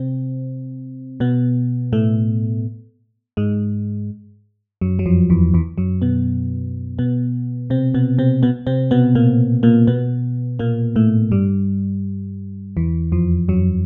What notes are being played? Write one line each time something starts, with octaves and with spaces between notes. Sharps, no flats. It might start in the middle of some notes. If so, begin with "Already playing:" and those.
Already playing: C3 C4
B2 B3
A2 A3
G#2 G#3
F#2 F#3
F#3
F2 F3
E2 E3
E2 E3
F#2 F#3
B2 B3
B2 B3
C3 C4
B2 B3
C3 C4
B2 B3
C3 C4
B2 B3
A#2 A#3
A#2 A#3
B2 B3
A#2 A#3
A2 A3
G2 G3
E2 E3
F2 F3
F#2 F#3